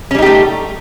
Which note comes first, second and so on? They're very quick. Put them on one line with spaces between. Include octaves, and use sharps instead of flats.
C#4 G3 D#4 G4 A3